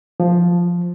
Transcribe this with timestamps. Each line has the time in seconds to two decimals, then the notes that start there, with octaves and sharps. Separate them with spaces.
0.20 F3